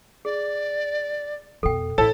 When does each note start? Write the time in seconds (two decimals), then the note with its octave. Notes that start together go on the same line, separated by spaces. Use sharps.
0.25 G#4 D5
1.63 F2 B2 A4 G5
1.98 A1 E4 A4 C#5